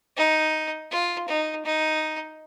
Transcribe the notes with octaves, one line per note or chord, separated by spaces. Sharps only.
D#4
F4
D#4
D#4